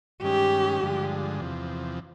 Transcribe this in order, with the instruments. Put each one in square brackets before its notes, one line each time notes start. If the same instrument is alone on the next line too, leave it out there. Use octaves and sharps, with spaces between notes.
[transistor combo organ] G2 D#3 G#3 C#4 [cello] G4
[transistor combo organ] G2 D3 F3 G#3
E2 C3 F3